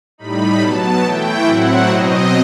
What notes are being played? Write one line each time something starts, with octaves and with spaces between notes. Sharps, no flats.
A2 G3 D#4 B5
B2 F#3 B3 A5
E3 A3 E4 G5
A2 F#3 C4 E4 F#5
B2 F#3 C4 D#5